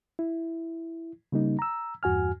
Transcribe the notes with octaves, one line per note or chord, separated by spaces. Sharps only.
E4
C#3 G3 A#3 D#4
A#5 E6
E2 G2 F#4 G#5 F6